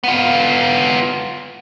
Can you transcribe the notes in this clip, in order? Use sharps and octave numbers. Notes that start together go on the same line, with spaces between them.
B3 F4